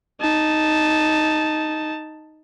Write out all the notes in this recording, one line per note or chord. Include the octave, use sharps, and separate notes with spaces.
D#4 A5